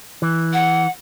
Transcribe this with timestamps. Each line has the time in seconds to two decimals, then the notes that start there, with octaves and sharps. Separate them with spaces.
0.22 E3
0.53 F#5